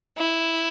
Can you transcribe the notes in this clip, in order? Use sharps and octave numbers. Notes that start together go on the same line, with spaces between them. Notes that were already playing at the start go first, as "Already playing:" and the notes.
E4